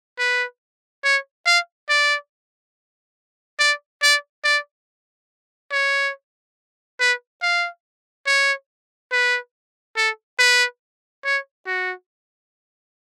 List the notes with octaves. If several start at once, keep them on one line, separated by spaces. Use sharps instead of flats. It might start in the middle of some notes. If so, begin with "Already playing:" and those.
B4
C#5
F5
D5
D5
D5
D5
C#5
B4
F5
C#5
B4
A4
B4
C#5
F#4